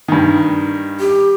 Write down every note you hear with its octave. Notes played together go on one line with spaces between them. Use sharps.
G2 D#3
G4